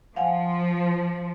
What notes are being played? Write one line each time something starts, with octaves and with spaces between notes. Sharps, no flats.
F3 F5 F#5 G#5